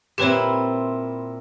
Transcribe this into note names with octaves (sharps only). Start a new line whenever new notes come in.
A#2 C4 E4 G4 B4 C#5